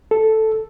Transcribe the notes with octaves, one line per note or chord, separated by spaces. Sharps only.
A4